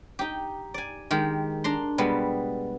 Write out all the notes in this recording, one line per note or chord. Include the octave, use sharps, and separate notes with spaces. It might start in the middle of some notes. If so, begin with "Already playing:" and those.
D#4 G4
D5 G#5
D#3 G#3 G4
D4 A#5 C6
B2 G3 G#3 B3